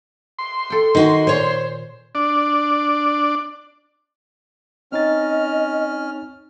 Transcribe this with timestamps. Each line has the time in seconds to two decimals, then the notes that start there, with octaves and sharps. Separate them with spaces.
0.39 C6
0.70 A4 G5
0.95 D#3 D#4 F#4 G#5
1.27 A#2 C5 C#5
2.15 D4 D5
4.92 C4 C#4 D#4 D#5 F6 A6